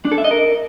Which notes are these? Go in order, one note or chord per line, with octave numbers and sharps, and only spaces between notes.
D4
A4
E5
D#5
A#4